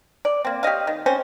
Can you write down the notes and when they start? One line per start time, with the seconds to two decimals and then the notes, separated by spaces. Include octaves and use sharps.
0.25 D5
0.45 A#3 C4
0.63 G4 C#5 D#5 F5
0.87 D#3
1.06 C4 C#4 C5